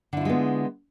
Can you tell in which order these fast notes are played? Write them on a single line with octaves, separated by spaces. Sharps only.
D3 E4 F4 G#3 B3